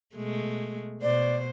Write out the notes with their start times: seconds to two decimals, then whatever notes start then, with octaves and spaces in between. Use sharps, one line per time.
0.16 B2 G#3 A3
1.02 B2 C5 D5